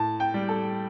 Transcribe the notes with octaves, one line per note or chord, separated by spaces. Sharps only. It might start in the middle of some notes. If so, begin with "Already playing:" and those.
Already playing: A2 A5
G5
G3
A4